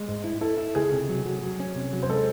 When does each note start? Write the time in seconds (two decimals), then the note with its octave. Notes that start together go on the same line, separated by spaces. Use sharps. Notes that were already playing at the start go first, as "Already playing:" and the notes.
Already playing: G#3
0.08 G#2
0.24 E4
0.41 E4 A4
0.58 E4
0.75 C#2 G#4
0.92 C3
1.09 F#3
1.26 F#3
1.43 F#3
1.60 C#4
1.75 C3
1.93 F#3
2.02 C5
2.09 G#3 A4